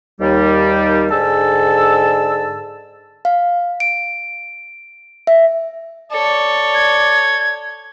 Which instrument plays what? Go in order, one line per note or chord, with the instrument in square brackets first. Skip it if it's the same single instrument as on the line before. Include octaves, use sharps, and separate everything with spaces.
[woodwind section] D#2 G3
G#2 D3 G#4 A5 E6
[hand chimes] F5
D7
E5
[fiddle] A4 C#5 [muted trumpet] D5
[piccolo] G#6